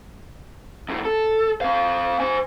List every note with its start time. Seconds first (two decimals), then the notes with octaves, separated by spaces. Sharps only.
0.89 F2 A2
1.05 A4
1.61 C4 F5
2.20 C5 G#5